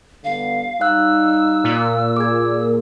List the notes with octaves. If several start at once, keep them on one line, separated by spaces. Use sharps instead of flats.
D3 G3 B3 F5
G3 D#4 F5 E6 F#6
A#2
G#4 D6 G#6